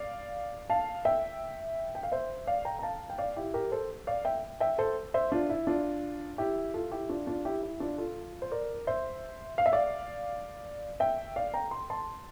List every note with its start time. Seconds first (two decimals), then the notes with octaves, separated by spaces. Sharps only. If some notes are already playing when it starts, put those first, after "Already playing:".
Already playing: D5 F5
0.70 F5 A5
1.05 E5 G5
1.95 G5
2.03 F5
2.12 C5 E5
2.47 D5 F5
2.65 G5 A#5
2.79 A#5
2.83 F5 A5
3.10 G5
3.18 D5 F5
3.36 E4 G4
3.54 G4 A#4
3.72 A4 C5
4.07 D5 F5
4.25 E5 G5
4.60 E5 G5
4.78 A4 C5
5.14 C5 E5
5.32 D4 F4
5.50 E4
5.67 D4 F4
6.38 E4 G4
6.74 F4 A4
6.92 E4 G4
7.09 D4 F4
7.27 D4 F4
7.45 E4 G4
7.63 E4
7.80 D4 F4
7.98 F4 A4
8.42 C5
8.52 A#4 D5
8.87 C5 E5
9.58 F5
9.66 E5
9.72 D5 F5
11.00 E5 G5
11.36 D5 F5
11.54 G5 A#5
11.71 C6
11.90 A5 C6